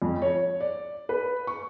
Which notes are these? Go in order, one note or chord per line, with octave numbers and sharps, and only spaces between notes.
F2
C#5
D5
B4
C#6